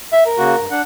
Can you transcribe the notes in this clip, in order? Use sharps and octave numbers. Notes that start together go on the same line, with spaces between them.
E5
A#4
C#3 A#3 F#4
G2
D4 F#5